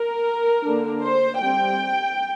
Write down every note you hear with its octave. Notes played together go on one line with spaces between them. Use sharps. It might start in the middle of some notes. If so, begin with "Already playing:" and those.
Already playing: A#4
D3 A#3 D4
C5
G3 C4 G5